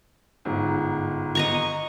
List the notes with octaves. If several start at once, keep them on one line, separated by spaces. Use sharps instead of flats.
G1 G#2
D#5 A#5 C#6